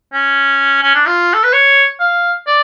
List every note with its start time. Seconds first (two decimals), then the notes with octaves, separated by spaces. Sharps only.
0.13 C#4
0.83 C#4
0.95 D4
1.06 F4
1.34 A4
1.44 B4
1.53 C#5
2.00 F5
2.47 D5